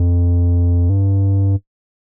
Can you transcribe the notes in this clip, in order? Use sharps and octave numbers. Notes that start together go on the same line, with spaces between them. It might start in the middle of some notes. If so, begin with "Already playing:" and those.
Already playing: F2
G2